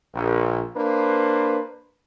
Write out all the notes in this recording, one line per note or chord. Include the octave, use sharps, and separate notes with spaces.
A#1
A#3 D4 B4 C5